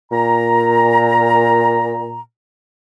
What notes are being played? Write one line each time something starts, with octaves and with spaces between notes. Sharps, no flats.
A#2 A#5